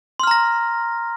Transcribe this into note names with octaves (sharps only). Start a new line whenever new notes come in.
A#5 C6 F6 A#6